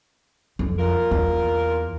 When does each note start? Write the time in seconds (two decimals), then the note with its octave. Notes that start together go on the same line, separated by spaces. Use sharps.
0.59 F2
0.79 A#2 F4 A#4
1.11 E2